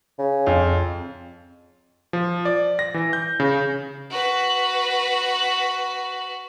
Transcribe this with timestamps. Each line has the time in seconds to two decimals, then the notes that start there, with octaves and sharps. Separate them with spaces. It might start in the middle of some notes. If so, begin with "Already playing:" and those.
0.19 C#3
0.46 F2
2.13 F3
2.45 D5
2.79 A#6
2.94 E3
3.13 G6
3.40 C#3
4.10 F#4 B4